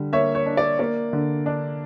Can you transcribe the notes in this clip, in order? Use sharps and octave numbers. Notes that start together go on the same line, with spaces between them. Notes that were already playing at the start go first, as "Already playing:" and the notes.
Already playing: D3 G3
A#3 C#5 E5
C#5
D4
D5
A#3 D5
D3
D4